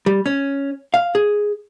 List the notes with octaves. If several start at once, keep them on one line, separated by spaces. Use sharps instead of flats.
G3
C#4
F5
G#4